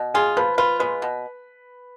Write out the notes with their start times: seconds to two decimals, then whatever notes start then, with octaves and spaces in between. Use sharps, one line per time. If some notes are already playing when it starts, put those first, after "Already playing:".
Already playing: B2
0.14 F4 G#4 G#5
0.37 F3 B4 B5
0.58 F4 B4 B5
0.80 G#3 B4 B5
1.02 B2